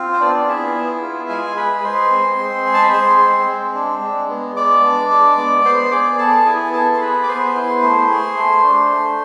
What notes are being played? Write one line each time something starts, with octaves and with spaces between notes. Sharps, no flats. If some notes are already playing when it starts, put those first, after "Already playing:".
Already playing: C4 F4
C5
B3 D4 D5
D5
E4 G#4 E5
B3
F4
G#3 G#4 G#5
G#4 B4 B5
G#3 C5 C6
C4
G#3
G#4
A5
B5
G#3 C5 C6
C4
G#3
D4
G#3
B3
G#3 D5 D6
D4
G#3
B3
B3 C5 C6
G#4 D5 D6
B3 A4 A5
E4 G#4 G#5
B3 A4 A5
C6
G#4 B4 B5
D6
B3 C5 C6
E4
A3
G#4
A3
D4
A3